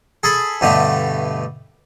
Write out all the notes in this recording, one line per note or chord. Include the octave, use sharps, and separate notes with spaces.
G#4 A4 B5
G2 B2 D3 A3